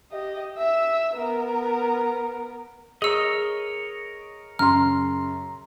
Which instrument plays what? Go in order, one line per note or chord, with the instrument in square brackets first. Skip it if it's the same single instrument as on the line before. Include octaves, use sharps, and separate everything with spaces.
[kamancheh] G4 D#5
E5 E6
B3 A#4
[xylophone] G#4 E6 [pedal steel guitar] A#4 C#5 D#5
[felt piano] F#2 C#3 C6 [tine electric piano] A#5 [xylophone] F6